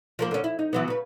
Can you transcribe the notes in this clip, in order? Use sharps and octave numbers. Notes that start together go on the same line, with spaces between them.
F3 A#3 A#4
D3 C#4
E4
D#4
E3 F#3 B3
C#3 B4